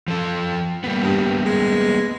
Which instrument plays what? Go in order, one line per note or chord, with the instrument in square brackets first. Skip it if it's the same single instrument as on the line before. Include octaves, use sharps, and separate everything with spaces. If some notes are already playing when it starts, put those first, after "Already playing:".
[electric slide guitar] F3 A4
G3 A#3 B3
[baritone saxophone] G2
G#3